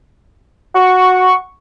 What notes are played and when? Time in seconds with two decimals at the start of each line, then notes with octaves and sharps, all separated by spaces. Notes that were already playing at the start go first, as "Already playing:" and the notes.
0.75 F#4 C#6